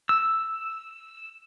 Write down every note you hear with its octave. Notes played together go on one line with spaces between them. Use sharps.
E6